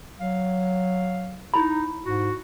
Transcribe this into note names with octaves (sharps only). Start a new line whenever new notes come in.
F#3 F5
D#4 E4 B5
G#2 F#4